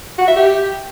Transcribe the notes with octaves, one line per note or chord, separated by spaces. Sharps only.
F#4
E5
G4